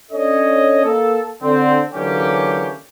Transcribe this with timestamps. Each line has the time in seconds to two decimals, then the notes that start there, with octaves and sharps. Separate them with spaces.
0.11 C#4 D4 A4 C#5 D#5
0.84 A#3 A4
1.42 D3 C4
1.93 D3 E3 F#3 A#3 C#4 G4